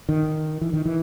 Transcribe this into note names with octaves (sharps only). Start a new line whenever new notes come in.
D#3
E3
D#3
E3